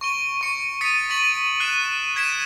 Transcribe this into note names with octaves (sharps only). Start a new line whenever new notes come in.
C#6 D7 G7
C#6 C#7 D7
D#6 A6 B6 C#7 D#7
C#6 A6 B6 D7 F#7
F#6 C7 E7
G#6 B6 C7 D7 E7